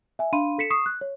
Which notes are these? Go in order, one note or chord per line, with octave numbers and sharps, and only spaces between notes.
E5 G#5
D4 F5 B5 C6 D#7
A4 B6 C#7 E7
C#6 D#6 C7 E7
F#6
C#5